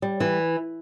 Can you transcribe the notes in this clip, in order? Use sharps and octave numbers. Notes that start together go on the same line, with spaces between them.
G3
E3